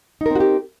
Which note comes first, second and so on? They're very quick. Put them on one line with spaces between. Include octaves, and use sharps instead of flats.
D#4 A#4 C4 F#4 G4